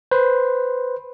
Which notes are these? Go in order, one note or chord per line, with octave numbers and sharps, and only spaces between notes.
B4 C5